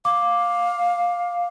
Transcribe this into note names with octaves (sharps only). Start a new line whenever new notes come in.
F5 D6